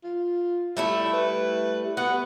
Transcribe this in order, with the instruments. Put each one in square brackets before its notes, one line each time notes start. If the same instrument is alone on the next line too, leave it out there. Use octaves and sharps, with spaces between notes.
[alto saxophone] F4
[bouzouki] G3 A3 E4 [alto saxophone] E5
[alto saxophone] B4
[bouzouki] B3 [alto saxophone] F#5